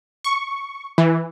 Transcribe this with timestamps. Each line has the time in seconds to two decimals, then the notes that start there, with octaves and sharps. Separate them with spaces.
0.24 C#6
0.98 E3